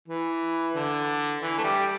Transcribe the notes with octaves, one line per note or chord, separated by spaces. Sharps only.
E3
D3
E3
A3
G3